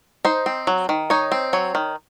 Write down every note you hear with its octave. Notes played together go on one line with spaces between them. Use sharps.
D#4 C5
C4
F#3
D#3
D#4 C#5
C4
F#3 C#5
D#3